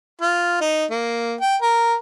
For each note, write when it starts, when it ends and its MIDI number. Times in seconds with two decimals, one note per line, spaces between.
0.21 0.57 65
0.61 0.85 63
0.91 1.35 58
1.41 1.56 79
1.62 1.95 70